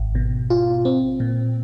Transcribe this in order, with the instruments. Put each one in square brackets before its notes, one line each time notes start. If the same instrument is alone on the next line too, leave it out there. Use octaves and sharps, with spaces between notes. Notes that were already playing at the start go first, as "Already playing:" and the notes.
Already playing: [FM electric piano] G#1
B2
F4
C4
A#2